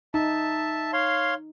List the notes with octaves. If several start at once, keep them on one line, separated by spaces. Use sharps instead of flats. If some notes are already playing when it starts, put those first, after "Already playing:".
D#4 E5 A5
C#5 F5 C6